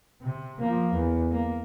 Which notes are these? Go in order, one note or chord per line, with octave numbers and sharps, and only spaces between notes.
C3
F3 A#3
E2
A#3